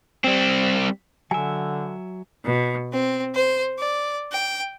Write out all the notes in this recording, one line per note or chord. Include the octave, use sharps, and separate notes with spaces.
G3 C4
D3 F#3 E5 G#5
B2
C4
C5
D5
G5